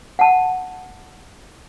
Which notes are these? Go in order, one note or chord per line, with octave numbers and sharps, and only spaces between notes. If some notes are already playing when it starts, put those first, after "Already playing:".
F#5 A5